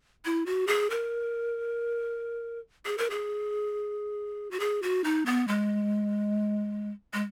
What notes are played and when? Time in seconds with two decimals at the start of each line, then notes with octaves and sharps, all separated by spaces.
0.25 E4
0.46 F#4
0.67 G#4
0.90 A#4
2.86 G#4
2.98 A#4
3.10 G#4
4.51 F#4
4.60 G#4
4.83 F#4
5.04 D#4
5.26 B3
5.48 G#3
7.14 G#3